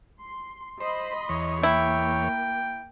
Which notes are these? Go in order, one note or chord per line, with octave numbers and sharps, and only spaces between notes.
C6
C5 D#5 B5 C6
E2 C#5
A#3 E4 G5